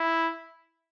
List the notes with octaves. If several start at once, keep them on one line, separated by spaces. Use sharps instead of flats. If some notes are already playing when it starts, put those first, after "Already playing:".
Already playing: E4